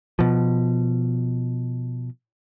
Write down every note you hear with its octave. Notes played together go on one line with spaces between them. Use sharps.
B2 F3